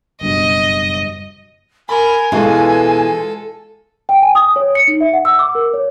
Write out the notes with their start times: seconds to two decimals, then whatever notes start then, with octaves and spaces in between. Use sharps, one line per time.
0.21 F#1 G2 B2 D#5
1.89 A#4 G#5 B5
2.32 B2 E3 G#3 F4 A4
4.09 G5
4.22 G#5
4.35 D#6
4.56 C#5
4.75 C#7
4.88 D#4
5.01 E5
5.13 F#5
5.25 E6
5.39 D6
5.55 A#4
5.74 C#5